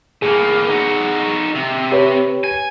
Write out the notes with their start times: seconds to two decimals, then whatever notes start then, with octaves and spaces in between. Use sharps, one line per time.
0.22 A2 A#3 G#4
0.69 D#4 F#4
1.55 C3
1.92 G4 B4 C#5
2.44 G#5